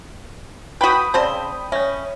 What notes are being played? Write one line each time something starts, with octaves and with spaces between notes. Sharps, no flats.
F#4 B4 G5 B5 D#6
C#3 C4 C5 D5 A5
C#4 C#5 E5